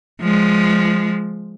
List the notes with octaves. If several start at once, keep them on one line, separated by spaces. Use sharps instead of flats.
F3 G#3